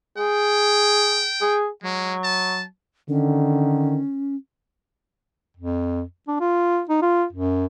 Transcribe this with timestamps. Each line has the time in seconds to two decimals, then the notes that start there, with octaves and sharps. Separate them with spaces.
0.18 G#4 G5
1.41 G#4
1.84 F#3 G#3
2.24 A5
3.09 D3 D#3 C#4
5.57 F2
6.28 D4
6.40 F4
6.89 D#4
7.02 F4
7.32 F#2